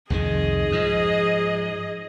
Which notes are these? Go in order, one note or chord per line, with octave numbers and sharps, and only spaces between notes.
C2 F2 D#3 G#4 D#5
G#2 F3